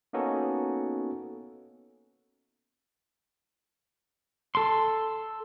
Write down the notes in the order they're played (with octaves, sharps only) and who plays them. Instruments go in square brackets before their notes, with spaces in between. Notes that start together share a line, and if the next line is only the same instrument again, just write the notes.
[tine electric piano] A#3 B3 C#4 D#4 F#4 A4
[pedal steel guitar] A4 C6